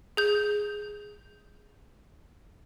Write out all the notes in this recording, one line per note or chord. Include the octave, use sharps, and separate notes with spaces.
G#4 G6